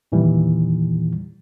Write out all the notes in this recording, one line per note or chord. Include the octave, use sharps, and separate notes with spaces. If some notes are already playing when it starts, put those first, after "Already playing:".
E2 A#2 D#3 E3 G3